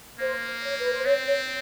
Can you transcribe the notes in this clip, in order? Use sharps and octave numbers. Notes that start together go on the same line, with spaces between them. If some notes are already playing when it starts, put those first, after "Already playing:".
A#3 C5
C#5
B4
C5
C4 C#5
C#5